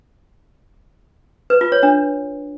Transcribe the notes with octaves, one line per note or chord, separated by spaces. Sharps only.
B4
F4
C#5
D4